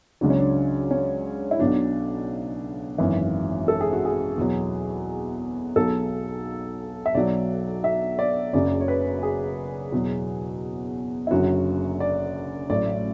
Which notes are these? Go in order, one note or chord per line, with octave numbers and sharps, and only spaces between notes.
C#2 C#3 F#3 D4
C#4
D4
C#4
E4
B1 B2 F#3 D4
G#1 F#2 E3
A4
G#4
F#4
G#4
E2 B2 F#3
B1 B2 F#3 A4
E5
B1 B2 F#3 D5
E5
D5
F#1 F#2 C#3 F#3 D5
C#5
B4
G#4
E2 B2 F#3
E4
F#1 F#2 D3 F#3 F#4
D5
A1 A2 F#3 D5